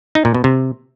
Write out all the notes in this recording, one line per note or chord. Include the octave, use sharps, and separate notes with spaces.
D#4
A#2
B2
C3